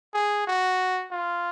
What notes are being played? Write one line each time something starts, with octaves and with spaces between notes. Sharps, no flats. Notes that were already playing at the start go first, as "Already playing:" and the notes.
G#4
F#4
F4